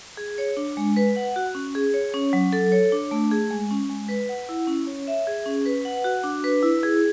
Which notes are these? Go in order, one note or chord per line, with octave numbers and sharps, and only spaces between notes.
G#4
C#5
D4
G#3
B4
F#5
F#4
C#4
G#4
C#5
C#4
F#3
A4
C#5
D4
A3
G#4
G#3
C#4
G#3
B4
F#5
E4
C#4
C#5
E5
G#4
C#4
B4
F#5
F#4
D4
B4
E4
G#4